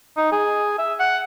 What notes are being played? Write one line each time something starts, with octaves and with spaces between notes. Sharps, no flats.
D#4
G#4
E5
F#5